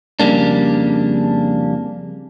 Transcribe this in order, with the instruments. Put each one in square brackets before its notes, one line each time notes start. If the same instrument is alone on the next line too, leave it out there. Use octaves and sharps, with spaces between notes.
[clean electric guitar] F2 C#3 E3 G3 A#3 D4